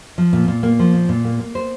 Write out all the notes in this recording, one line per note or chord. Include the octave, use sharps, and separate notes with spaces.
F3
A#2
A#2
A#3
F3
A#2
A#2
A#3
A#3
C5